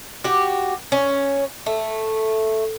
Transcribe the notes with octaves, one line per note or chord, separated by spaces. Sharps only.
F#4 G4
C#4
A3